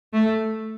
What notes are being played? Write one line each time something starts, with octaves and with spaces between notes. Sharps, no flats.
A3